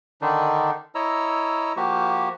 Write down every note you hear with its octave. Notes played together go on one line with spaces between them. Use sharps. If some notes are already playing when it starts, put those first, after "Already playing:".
D3 D#3 D4 D#4
E4 C#5 D#5 A#5 E6
F3 A#3 F#4 G4